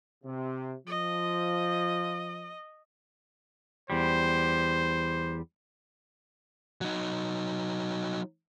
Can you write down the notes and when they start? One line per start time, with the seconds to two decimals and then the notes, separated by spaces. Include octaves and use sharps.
0.24 C3
0.87 F3 D#5
3.90 E2 G3 C5
6.81 F#3 D#4